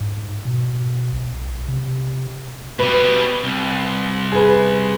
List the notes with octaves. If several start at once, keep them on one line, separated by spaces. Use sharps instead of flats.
G#2
B2
B1
C3
B2 G3 B4
C2
G#4 B4